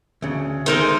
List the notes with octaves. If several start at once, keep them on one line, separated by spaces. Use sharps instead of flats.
D2 C#3
D#3 G#3 A3 D#4 A#4 C5